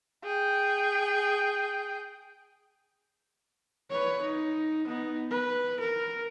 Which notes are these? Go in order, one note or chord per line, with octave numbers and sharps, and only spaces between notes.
G#4 G5
B4 C#5
D#4
B3 D#4
B4
A#4